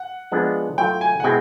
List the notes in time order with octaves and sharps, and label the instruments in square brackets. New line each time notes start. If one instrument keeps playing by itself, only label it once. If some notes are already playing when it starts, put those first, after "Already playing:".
Already playing: [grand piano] F#5
[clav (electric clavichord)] F3 G#3 B3 D4
[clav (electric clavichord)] F#3 A3 C4 F4 [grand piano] G5
[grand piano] G#5
F#5
[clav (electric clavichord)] B2 G#3 C4 E4 G#4 [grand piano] G5